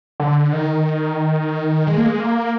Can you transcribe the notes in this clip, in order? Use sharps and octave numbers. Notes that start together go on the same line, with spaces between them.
D3
D#3
G#3
A#3
G#3
A#3